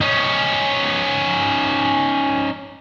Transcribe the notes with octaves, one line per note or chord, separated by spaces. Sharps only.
C#4 D#4